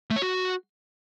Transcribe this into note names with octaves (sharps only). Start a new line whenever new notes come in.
A3
C#5
F#4